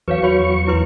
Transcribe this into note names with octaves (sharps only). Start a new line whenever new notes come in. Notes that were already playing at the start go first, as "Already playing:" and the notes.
E2 F#3 B4 C#5 F5 C#6
F#4 C#5 B5
E4 B4 C6